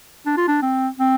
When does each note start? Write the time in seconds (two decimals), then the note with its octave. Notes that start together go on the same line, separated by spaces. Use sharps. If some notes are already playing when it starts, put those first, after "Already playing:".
0.26 D4
0.37 F4
0.48 D4
0.62 C4
0.99 C4